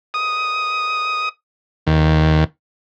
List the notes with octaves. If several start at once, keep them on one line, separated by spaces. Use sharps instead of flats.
D#6
D#2